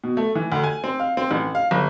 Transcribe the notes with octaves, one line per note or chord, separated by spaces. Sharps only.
B2
A3
E3
D2
G#5
C4
F5
C4
A1
F5
G1